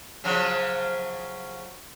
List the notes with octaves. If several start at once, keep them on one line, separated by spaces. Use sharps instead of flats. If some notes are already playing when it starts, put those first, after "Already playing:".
C#3 F3 F#3